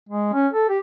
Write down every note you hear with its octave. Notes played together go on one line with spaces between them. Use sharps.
G#3
C#4
A4
G4